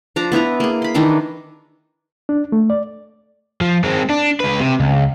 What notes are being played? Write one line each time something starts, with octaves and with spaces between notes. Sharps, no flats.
F3 D4 A#5 D6
B3 E4 B4 A#5
A#3 G#4
B5 C6
D#3 E3 D4 E4
D4
A3
D5
F3
G#3 C4
D4
C#2 B4
C3
C#2